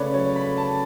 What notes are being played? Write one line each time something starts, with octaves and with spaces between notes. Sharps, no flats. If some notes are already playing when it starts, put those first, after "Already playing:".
Already playing: C#3 A3 C#4 B4 C#5 D5
F#3 C#5
B5
A3
A5